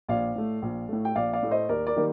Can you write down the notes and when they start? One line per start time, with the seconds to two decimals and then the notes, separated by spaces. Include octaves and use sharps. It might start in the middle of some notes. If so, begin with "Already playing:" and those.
0.09 A#1 D5 F5
0.36 A2 A3
0.62 A#1
0.89 A2 A3
1.05 G5
1.15 A#1 D5 F5
1.33 D5 F5
1.43 A2 A3
1.51 C5 D#5
1.69 D#2 A#4 D5
1.87 A#4 D5
1.96 D#3 G3 A#3